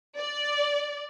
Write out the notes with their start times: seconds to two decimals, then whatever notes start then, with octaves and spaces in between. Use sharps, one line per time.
0.16 D5